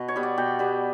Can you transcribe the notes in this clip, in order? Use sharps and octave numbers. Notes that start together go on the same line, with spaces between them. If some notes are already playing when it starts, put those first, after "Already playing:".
Already playing: B2
C#5
G3 B3
D5
B2 G5
G3 B3